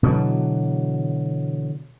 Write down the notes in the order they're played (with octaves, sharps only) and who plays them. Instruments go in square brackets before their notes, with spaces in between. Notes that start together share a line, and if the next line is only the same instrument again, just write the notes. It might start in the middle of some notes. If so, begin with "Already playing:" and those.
[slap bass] B2 D3 E3 F#3